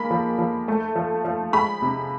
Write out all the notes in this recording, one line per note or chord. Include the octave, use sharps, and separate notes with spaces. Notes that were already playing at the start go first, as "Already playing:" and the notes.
Already playing: G#3 A#3 B5
F3
F3
A3
F3
F3
G#3 B5
C3